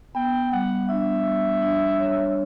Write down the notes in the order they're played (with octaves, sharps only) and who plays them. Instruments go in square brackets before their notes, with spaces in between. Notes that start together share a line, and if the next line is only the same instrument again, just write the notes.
[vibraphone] B3 [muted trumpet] G5
[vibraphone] G3 [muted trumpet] F#5
[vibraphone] D4 [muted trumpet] E5
[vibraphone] G3
D4
C#5